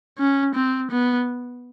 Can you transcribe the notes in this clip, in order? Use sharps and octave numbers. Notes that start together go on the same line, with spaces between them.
C#4
C4
B3